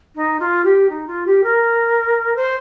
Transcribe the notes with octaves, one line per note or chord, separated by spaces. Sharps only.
D#4
F4
G4
D#4
F4
G4
A#4
C5